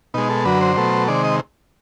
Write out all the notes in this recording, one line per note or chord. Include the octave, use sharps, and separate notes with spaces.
B2 G#3 D#4
A4
F#2 D3 F#3 B4
C5
B2 F#3 A3
C3 D#3 G#3 D5
D#5